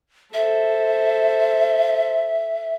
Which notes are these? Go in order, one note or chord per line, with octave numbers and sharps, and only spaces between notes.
A4 C5 E5